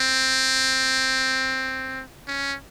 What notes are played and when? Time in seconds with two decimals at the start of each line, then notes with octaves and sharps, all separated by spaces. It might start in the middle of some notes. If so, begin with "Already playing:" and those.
Already playing: C4
2.28 C#4